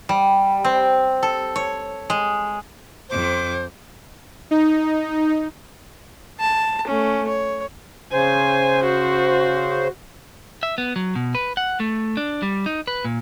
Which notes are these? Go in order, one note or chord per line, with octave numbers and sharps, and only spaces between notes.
G3
C4
A4
C#5
G#3
F2 C5 D6
D#4
A5
A3 C#4
C#5
C#3 C5 G#5
F#4
E5
B3
F#3
B2
B4
F#5
A3
D4
G3
D#4
B4
A#2